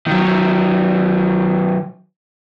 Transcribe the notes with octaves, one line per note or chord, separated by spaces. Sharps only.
D#3 F#3